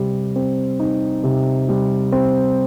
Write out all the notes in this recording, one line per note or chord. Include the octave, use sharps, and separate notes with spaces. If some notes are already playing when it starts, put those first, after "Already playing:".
Already playing: C3 G3
C4
D#4
C3
G3
C4